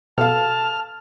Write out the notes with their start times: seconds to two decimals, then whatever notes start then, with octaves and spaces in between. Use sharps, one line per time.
0.18 B2 A4 F5 A5 F6